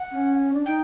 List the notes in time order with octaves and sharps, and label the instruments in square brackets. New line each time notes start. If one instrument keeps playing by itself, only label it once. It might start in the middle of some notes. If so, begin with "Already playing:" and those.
Already playing: [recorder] F#5
[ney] C#4
D4
[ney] D#4 [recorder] G5